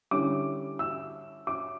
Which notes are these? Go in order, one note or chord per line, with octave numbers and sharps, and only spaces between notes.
D3 G3 C#4 E4 D6
E6
D6